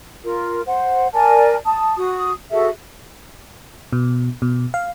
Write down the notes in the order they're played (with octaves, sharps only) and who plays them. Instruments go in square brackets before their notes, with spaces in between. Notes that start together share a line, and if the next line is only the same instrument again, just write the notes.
[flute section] F4 A#4
C5 F#5
A#4 D5 G#5 A5
A5 D#6
F#4 D#6
F#4 G#4 A4 E5
[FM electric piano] B2
B2
F5